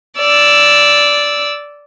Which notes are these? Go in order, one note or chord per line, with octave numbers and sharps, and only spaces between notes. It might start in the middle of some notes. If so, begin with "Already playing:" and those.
D5 E6